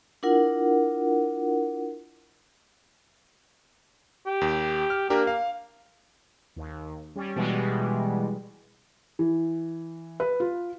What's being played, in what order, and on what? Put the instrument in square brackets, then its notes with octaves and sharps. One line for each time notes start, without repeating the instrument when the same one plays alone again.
[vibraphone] D4 E4 F4 A#4 F#5
[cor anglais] G4
[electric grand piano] D#2
F6
[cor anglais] A#3 [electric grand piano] D4 G4 A#4
[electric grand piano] F5
[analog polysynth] D#2
G3 C#4
B2 E3 G3 G#3
[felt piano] E3
B4
F4